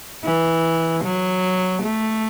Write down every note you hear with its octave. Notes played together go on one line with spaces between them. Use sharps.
E3
F#3
A3